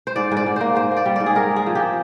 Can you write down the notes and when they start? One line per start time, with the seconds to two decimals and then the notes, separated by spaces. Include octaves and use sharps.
0.07 C5
0.16 G#2 D5
0.32 G#2
0.37 D5
0.46 G#2
0.56 A#3 C5
0.75 G#2 C5
0.91 A#3
0.97 D5
1.06 G3
1.16 G#2 D5
1.26 G#4
1.35 G#3 A#4
1.51 G#3
1.56 G#4
1.66 F3
1.75 G4
1.82 C4